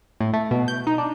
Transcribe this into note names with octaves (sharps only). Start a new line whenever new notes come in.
A2
A3
B2
G6
D#4
D4